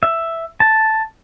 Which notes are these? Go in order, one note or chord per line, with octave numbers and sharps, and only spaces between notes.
E5
A5